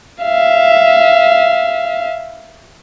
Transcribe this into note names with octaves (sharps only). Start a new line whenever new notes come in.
E5 F5